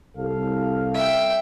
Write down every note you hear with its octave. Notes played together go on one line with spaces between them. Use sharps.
C2 A4 F5
E5 G5